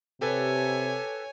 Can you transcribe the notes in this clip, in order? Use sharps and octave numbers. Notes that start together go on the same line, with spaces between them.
C3 G4 A4 B4 C#5 G#5